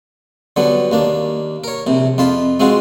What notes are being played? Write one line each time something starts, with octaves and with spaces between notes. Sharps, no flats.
D3 F#3 G3 B3
D#2 A#3 D4
A#4 C#5
A#1 C3
F2 F4 A5 B5
G#3 C4 F4 F#4